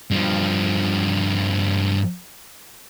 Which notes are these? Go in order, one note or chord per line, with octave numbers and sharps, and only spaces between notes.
G2 F3